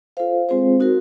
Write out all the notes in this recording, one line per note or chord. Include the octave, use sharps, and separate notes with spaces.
F4 A4 C5 F5
G#3 C4 F4 G#4 C5
D#4 F#4 A#4